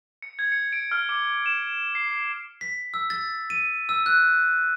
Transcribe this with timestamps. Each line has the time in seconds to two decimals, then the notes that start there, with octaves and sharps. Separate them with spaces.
0.22 C#7
0.39 G#6
0.52 C#7
0.73 D7
0.92 F6
1.09 D6
1.46 E7
1.95 C7
2.11 C7
2.61 B6
2.94 E6
3.10 A6
3.50 D#7
3.89 E6
4.06 F#6